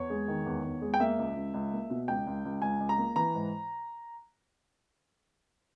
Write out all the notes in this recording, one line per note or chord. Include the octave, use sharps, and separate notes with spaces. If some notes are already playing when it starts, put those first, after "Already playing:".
Already playing: E2 C#5
G#3
D#3
E2
E2
G#3
G5
A#3 E5
C#2
C#2
C#2
A#3
B2
C#2 G5
C#2
C#2
C#2 G#5
C#2
A#5
A#3
E3 A#5
G#2